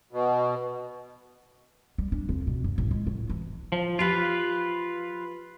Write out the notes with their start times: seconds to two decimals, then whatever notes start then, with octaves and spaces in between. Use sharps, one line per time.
0.13 B2
1.98 G3
2.12 D4
2.29 F2
2.47 B2
2.64 F#2
2.78 A1
2.91 G#3
3.07 A2
3.29 E3
3.72 F3
3.99 F3 F4 G4 B4